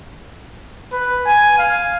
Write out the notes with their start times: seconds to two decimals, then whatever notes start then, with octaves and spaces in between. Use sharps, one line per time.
0.92 B4
1.26 G#5
1.58 F5